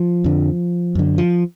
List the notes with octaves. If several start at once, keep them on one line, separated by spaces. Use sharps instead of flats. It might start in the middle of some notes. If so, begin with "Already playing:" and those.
Already playing: F3
F2 D3
F#2 D3
F3